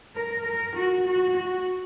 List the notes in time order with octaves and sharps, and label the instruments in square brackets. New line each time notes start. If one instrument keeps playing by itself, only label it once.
[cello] A#4
A#4
F#4
F#4
F#4